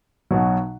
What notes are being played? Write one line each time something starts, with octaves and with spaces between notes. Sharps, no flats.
B1 B2 F#3